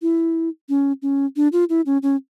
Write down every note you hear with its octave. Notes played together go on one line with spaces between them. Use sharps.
E4
C#4
C#4
D4
F4
E4
C#4
C#4